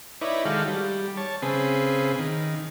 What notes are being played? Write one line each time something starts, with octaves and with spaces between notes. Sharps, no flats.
D#4 E4 B4 C#5 D5
D#3 G#3 F#4 A4 F5 G5
G3
C#5 A5
C#3 C4 G#4 B4
D#3